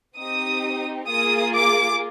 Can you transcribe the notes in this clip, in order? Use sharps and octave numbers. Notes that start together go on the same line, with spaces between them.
C4 D#4 G4 D#6
A#3 F4 G#4 D#6
D6